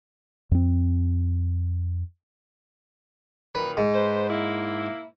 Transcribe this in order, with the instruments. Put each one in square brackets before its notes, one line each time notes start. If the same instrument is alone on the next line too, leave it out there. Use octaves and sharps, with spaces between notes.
[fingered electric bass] F2 C4
[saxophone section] F#2 A#2 D#3 [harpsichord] B4
[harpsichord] G#2
[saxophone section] B4 C5
A#3 E4